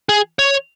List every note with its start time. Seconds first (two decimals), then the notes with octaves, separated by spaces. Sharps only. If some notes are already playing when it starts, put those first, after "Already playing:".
0.09 G#4
0.39 C#5